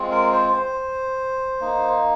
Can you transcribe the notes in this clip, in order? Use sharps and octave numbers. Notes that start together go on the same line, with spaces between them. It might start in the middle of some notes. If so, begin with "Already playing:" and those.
Already playing: G#3 C4 F4
A#4
C5
C5
A#3 D#4